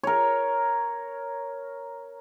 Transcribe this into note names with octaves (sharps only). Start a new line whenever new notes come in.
A#4 C#5